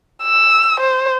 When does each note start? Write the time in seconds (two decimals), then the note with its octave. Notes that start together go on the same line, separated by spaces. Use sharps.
0.23 E6
0.80 C5